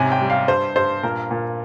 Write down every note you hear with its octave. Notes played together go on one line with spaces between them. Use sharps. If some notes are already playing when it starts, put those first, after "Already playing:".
Already playing: G#2 C3 C#4 G#5
G5
G3
F5
G2 C5
G2 C5
A#2 A#4
A#2